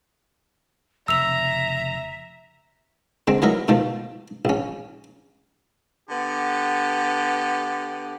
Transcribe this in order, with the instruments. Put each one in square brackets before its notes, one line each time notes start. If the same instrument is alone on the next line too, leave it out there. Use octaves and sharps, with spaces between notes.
[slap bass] F1 C#3 [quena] E5 [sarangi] A#5 [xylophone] E6 F7
[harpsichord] D3 G#3 C4
E3 F#3 D#4 A#4 E5
B2 D#3 F3 A3
A#1 C#4
[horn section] D3 B3 G4